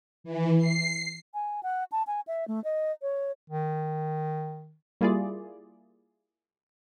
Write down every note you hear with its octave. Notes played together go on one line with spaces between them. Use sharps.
E3
C7
G#5
F#5
A5
G#5
E5
A3
D#5
C#5
D#3
G3 A#3 E4 F4 G#4 D5